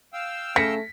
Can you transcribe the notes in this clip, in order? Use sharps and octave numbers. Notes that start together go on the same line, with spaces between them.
F5 G5 E6
C#3 A3 A#6 B6 C#7